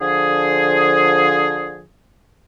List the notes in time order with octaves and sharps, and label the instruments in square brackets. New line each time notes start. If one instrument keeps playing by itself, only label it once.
[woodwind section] D3 F3 G#4